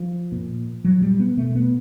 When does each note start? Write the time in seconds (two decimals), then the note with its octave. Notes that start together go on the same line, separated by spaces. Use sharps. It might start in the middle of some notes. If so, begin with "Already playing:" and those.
Already playing: F3
0.32 A#2
0.85 A#2 F#3
1.02 G3
1.20 B3
1.37 B2 A3
1.55 B3